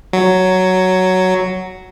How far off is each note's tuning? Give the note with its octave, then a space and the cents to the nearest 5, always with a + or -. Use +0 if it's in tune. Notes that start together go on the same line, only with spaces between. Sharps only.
F#3 +5